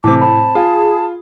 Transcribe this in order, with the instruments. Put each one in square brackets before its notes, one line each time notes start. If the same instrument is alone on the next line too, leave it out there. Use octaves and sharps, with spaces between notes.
[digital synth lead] A2 [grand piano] C3 E3 [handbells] A5 [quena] D6
[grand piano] C4 [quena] A5 [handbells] B5
[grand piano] F4 [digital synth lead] G#4